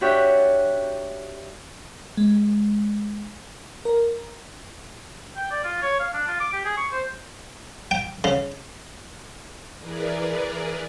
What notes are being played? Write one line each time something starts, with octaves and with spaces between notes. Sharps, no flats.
D4 F#4 G4 C#5 E5 G5
G#3
A#4
G5
D5
F4
C#5
F5
D4
F4
D6
G4
G#4
C#6
C5
G5
C#3
E3 G#4 A#4 B4 D5